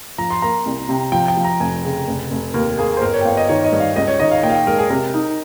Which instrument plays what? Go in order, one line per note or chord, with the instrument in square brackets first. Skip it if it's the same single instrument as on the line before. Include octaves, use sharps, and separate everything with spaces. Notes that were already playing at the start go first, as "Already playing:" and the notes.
[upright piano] F3 [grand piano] A#5
[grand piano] C6
[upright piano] A#3 [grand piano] A#5
[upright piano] C2
C3
[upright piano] F3 [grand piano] G5
[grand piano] G5
[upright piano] F3
[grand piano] A#5
[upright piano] F1 [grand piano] G#5
[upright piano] C#3
F1
F1
[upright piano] D#2 [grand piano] A#4
[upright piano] A#3 [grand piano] G#4
[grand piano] C5
[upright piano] G1 [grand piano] A#4
[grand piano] C#5
G5
[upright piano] G1 [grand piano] F5
[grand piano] D#5
[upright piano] D#3 [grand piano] C#5
[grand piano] D#5
[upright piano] G2
[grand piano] F5
[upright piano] C#2 [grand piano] D#5
[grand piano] C#5
[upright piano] D#3 [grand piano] D#5
[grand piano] F5
[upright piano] A#2 [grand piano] G5
[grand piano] F5
G5
[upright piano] G#3 [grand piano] A#4
[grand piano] G#4
[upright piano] C3 [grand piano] A#4
[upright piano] D#4